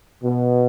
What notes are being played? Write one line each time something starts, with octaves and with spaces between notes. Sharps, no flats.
B2